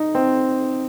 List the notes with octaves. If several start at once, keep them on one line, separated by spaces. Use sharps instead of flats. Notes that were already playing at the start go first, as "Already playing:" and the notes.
Already playing: D#4
C4